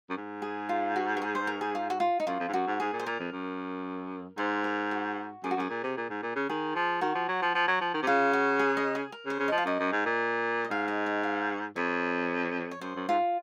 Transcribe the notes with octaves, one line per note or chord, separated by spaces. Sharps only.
F#2
G#2
G#4
F4
F#4
A#4
G#4
C5
A#4
G#4
F4
F#4
F4
D#4
F#2 F4
F2
G#2
F#2 F#4
G#2
G#2 G#4
A#2
C5
A#2 A#4
F2
F#2
G#2 C5
A#4
F#4
F#2 G#4
F#4
F#2 G#4
A#2
C3
A#2
G#2
A#2
C#3
D#3 G#4
F3
D#3 F#4
F3
F#3
F3
F3
F#3
F3
D#3
C3
C#3 F4
F#4
G#4
D#5
G#4
A#4
C#3
C5
C#3
F3 D#5
F5
F#2 D#5
F#2
G#2
A#2
D#5
G#2 F5
D#5
D#5
F5
F2 C#5
C#5
F#2 C5
F#2
G#2 F4